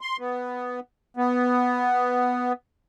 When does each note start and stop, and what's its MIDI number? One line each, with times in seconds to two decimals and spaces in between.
0.01 0.17 84
0.19 0.80 59
1.17 2.53 59